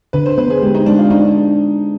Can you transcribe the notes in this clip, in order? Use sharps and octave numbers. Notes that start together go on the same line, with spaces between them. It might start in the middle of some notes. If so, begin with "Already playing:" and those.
D3 B4
C5
B3 B4
G#4
G#3 G4
D#4
G#3 D4
F4
D4 D#4